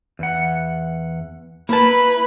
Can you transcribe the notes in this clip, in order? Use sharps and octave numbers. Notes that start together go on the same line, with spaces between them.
E2 F#5
A#3 E4 B4 A5 B5